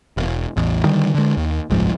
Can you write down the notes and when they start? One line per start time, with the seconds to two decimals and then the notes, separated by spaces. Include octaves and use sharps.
0.17 E1
0.57 A1 E2
0.85 D3 D#3 G3
1.15 D3 G#3
1.37 D#2
1.70 F#1 C2 G#2 F3